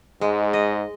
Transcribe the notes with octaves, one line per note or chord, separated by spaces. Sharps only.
G#2 G#3
D#5